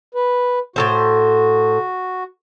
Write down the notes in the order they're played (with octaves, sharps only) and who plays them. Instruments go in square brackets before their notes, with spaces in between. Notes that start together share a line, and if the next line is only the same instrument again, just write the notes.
[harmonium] B4
[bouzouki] A2 F#3 C5 [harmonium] F#4